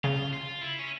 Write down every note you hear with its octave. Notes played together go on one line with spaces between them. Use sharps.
C#3 F4
F4
E4
C#4